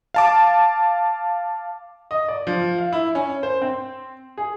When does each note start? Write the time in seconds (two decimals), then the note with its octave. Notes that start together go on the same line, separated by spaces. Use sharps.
0.14 F5 A5 D6
2.11 D#5
2.28 D5
2.47 F3
2.78 F5
2.93 E4
3.15 C#4
3.43 C5
3.62 C4
4.37 G#4